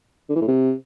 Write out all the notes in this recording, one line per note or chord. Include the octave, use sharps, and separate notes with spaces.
D3
E3
A2
C3